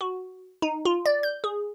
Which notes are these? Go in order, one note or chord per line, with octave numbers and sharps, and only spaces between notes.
F#4
D#4
F4
D5
G6
G#4